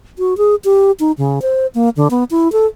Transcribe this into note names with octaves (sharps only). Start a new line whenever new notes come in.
F#4
G#4
G4
D#4
C#3
C5
A#3
D3
B3
E4
A4